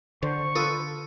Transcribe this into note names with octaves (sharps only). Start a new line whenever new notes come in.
D3 C5 C#6
F4 A4 B4 D#6